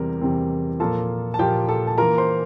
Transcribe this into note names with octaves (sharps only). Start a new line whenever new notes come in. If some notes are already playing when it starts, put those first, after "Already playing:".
Already playing: E2 C3 G3 C4 A#4
E2 C3 G3 C4
A#2 F3 A#3 F4 A4 A5
A5
A#2 F3 A#3 F4 G4 G5
A4 A5
A5
E3 A#3 F4 A#4 A#5
C5 C6